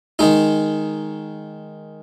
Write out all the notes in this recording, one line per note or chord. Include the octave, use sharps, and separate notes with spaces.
D#3 G#3 D#4